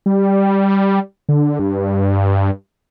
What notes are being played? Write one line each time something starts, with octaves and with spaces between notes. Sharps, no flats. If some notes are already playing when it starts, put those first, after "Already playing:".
G3
D3
G2